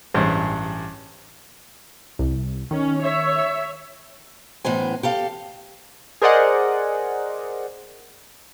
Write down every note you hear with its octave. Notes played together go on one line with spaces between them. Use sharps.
A1 G2 G#3 C5
C2
D#3 C#4
C#5 E5
F#2 A2 E3 B3 C5 G#5
G4 A4 F5
G#4 A#4 C5 D5 D#5 F#5